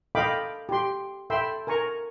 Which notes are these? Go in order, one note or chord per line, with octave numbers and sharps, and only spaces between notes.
A4 D#5 F5 G5 B5 D6
G4 C6
A4 E5 G5 B5 C6 E6
A#4 G#5 A#5 C#6